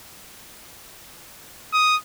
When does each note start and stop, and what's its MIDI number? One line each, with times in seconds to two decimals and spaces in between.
1.73 1.96 87